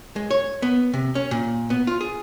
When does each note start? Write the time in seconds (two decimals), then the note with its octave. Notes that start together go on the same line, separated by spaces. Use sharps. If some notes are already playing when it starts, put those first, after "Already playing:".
0.16 G#3
0.31 C#5
0.62 B3
0.94 C3
1.15 C#4
1.31 A#2
1.70 B3
1.87 F4
2.01 G#4